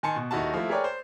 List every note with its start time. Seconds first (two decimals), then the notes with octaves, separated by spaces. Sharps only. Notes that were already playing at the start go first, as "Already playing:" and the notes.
0.03 D#3 G#5 A5 C6 C#7
0.16 B2
0.31 D#1 D#3 D#4 E4 F#4 A5
0.54 F3 A3 E4
0.69 G#4 A#4 B4 C#5 D5 G5
0.84 C5